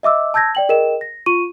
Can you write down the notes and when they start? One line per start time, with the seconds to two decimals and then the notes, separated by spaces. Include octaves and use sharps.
0.03 D#5 E5 D6 E6
0.34 A5 E6 G6 G#6 A#6
0.55 D5 G5 F#7
0.69 G#4 A#4 D#5 G5 E7
1.01 A#6
1.26 F4 C#6 D#7